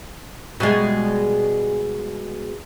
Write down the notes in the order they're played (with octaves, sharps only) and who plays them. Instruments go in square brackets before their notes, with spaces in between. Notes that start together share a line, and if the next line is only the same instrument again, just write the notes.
[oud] B2 G3 G#3